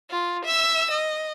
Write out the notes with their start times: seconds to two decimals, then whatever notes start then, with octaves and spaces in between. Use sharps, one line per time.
0.10 F4
0.45 E5 E6
0.91 D#5